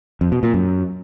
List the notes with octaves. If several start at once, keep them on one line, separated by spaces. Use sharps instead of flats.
F2
B2
A#2
F#2